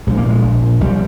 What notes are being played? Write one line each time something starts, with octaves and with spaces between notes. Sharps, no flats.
A#1 G#3
A#3
A#2 G#3
A#1
A#2
A#1 G3